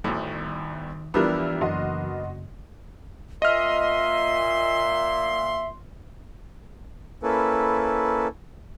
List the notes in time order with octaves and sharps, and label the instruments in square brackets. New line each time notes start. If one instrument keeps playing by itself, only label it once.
[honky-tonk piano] G1 [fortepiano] D2 A2 [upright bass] D#3
[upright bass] E3 [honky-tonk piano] F3 G3 E4 [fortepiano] B3 D4 A#4
[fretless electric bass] F#1 [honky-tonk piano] F#4 D#5 C6
[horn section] A#2 C6 [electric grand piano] D#5 F6 [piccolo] E5
[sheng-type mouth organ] A#3 C#4 E4 A4 B4